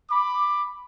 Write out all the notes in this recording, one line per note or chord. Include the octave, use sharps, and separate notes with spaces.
B5 D6